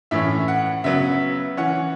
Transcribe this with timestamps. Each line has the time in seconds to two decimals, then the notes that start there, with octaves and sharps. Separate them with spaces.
0.11 A2 E3 C#4 E5
0.48 F#5
0.84 C#3 F#3 B3 E5
1.57 E3 C#4 F#5